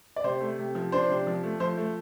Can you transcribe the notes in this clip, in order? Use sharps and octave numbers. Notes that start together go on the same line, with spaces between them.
D5
C3 C5
A3
C3
F3
D4 C5
C3
F3
A3
F3 C5
A3